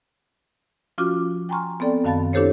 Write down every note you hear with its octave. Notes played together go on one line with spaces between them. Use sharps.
F3 C#4 F4 F#4 D6 F6
G5 G#5 A#5 C6 C#6 F6
B3 C4 A4 D5 G5
F#2 D#3 F5 A5 B5 A6
D4 E4 G4 A4 C5 C#5